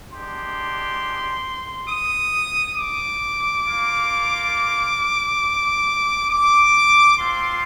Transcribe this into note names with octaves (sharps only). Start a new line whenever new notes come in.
G#3 D4 G4 C6
D#6
D6
A#3 F4
D6
C4 F4 C6